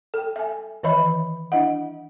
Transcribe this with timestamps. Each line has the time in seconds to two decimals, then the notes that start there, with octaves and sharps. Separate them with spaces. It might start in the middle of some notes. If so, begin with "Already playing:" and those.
0.14 A4 G5
0.36 E5 G#5
0.83 D#3 E3 B4 D#5 E5 B5
1.52 D4 E4 D#5 E5 F#5